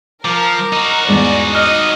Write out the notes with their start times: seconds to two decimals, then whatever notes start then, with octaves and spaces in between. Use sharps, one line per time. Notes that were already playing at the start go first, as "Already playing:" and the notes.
0.25 F3 A#4 D6
0.73 D#4 F#4
1.09 E2 G#2 G#3 D5
1.55 D#5 F6